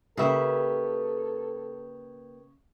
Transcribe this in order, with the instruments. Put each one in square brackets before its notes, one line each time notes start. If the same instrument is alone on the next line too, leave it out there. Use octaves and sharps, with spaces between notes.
[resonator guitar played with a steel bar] C#3 E5 [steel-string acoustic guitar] A#3 G4 B4 [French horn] A4